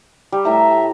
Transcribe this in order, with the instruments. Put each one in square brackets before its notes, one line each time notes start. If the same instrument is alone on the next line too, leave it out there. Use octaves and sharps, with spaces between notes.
[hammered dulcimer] G3
[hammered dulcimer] A2 A#5 [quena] E5